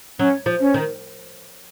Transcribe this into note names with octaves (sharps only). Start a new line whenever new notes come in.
F#3 C#4
F3
C#4
D#3